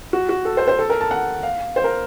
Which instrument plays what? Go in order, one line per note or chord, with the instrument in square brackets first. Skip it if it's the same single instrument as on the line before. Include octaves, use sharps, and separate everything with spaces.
[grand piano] F#4
F#4
A4
C5
C5
A4
A#4
A5
F#5
F5
C5
A#4